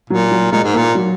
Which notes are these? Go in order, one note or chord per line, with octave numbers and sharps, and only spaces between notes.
A#2 F#3
F#3
A#2 G#3
G#2
A#3
A#2
F#3